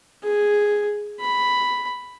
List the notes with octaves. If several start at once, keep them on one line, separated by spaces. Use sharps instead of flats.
G#4
B5